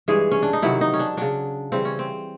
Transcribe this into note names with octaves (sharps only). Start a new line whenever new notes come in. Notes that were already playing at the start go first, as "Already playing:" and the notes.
G2 E3 G#3 G#4
C#4
D4
D#4
C3 D#3 F#3 E4
D#4
C#4
D4
C#3 F#3 D4
C#3 E3 G3 C4
C#4
C4